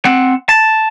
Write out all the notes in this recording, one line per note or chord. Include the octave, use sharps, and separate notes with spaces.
C4 F#5
A5